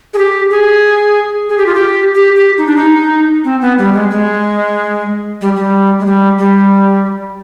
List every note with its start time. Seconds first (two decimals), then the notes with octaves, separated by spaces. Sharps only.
0.14 G#4
0.18 G4
0.51 G#4
1.49 G#4
1.58 G4
1.66 F4
1.75 G4
2.15 G4
2.36 G4
2.58 D#4
2.67 D4
2.76 D#4
3.44 C4
3.61 B3
3.78 G3
3.94 G#3
4.11 G#3
5.41 G3
5.56 G3
6.00 G#3
6.06 G3
6.39 G3